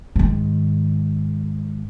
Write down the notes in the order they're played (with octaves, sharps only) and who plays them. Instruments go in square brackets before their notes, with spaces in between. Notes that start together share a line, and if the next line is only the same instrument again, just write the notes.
[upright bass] G#2 D#3